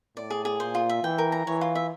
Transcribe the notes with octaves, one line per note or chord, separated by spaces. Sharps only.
A2 D5
G#4
G#4
A#2 C5
F4
E5
E3 G5
A#4
A#5
E3 C#5
F4
E5